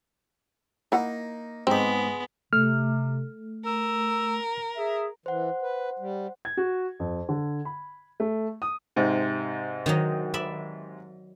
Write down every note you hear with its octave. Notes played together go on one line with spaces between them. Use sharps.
A#3 D#4 E4 F#5
G#2 G#3 B3 C4 D#4 G4 D6
C3 A3 F6
A#4 E6
G#4 E5
E3 C5 F#5
B4
G3
G#6
F#4
F2
D3
B5
A3
D#6
G#2 C3
D#3 F#3 D#4
D5 E5 B5